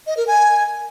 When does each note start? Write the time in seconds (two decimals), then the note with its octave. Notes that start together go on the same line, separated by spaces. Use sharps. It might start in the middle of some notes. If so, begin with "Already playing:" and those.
0.07 D#5
0.17 A#4
0.27 G#5